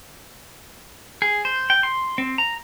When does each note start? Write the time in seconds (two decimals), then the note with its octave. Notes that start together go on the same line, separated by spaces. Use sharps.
1.22 G#4
1.45 C5
1.70 G5
1.83 C6
2.18 C4
2.38 A#5